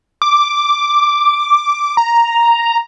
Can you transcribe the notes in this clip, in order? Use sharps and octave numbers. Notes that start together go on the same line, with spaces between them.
D6
A#5